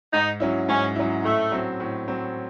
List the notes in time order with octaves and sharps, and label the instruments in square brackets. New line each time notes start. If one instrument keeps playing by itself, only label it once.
[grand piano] G#2 [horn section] D#4
[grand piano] F#3 C#4 E4
[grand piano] G#2 [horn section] C#4
[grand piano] F#3 C#4 E4
[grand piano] A2 [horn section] A3
[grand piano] F#3 C4
A2
F#3 C4